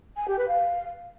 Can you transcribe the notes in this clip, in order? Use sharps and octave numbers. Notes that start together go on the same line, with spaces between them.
G#5
G4
B4
F5